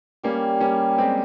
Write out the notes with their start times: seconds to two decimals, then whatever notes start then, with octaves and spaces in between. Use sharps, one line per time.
0.23 G3 A#3 C#4
0.60 G3 A#3 C#4
0.98 G#3 C4 G4